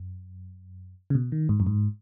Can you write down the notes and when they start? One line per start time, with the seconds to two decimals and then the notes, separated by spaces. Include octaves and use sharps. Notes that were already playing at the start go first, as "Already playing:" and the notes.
Already playing: F#2
1.10 C#3
1.15 B2
1.32 D#3
1.49 G#2
1.60 F#2
1.67 G#2